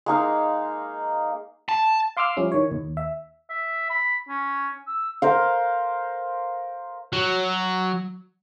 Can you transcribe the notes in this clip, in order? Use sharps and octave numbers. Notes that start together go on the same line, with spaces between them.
G#3 A#3 D#4 F5
A5
F5 C6 D6 E6 F6
F3 G3 C#4 E4
D#3 C#5
D#2
E5
E5
B5
C#4
E6
A#4 C5 F5
F#3